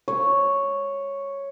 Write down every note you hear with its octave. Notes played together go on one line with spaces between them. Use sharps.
C#5